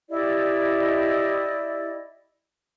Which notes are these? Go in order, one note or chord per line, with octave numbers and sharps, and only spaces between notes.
E4 G4 D5 D#5